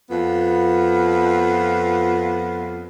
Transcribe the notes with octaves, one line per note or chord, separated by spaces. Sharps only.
F2 B3 F4